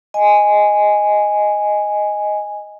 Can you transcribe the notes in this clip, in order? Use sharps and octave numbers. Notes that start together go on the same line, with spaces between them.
D#5 G#5